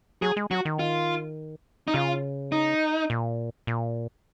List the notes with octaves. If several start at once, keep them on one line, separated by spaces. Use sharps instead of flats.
F#3 G#4
G#3
F#3 F#4
D#3
F4
D#4
C#3 F4
D#4
A#2
A#2